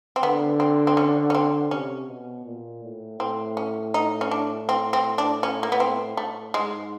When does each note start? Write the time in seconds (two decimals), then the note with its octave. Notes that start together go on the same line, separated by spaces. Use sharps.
0.16 C4
0.23 D3 B3
0.60 C4
0.87 C4
0.97 C#4
1.30 C#4
1.35 C4
1.71 C3 C#4
2.08 B2
2.46 A#2
2.83 A2
3.20 A2 C4
3.57 C#4
3.94 D#4
4.21 C#4
4.31 D4
4.69 C4
4.93 C4
5.18 D4
5.43 C#4
5.63 A#3
5.72 B3
5.80 C4
6.17 A2 A3
6.54 G#2 G#3